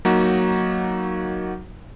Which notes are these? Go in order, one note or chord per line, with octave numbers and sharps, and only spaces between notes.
F#3 A#3 D#4 F#4